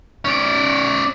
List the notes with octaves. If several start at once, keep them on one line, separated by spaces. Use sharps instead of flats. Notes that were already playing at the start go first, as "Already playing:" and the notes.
C#4 D5